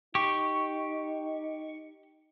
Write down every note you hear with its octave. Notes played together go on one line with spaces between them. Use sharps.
D#4 G4 C#6